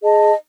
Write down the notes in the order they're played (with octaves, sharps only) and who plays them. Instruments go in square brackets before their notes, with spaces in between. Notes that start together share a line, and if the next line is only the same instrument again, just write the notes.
[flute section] G#4 D#5 A5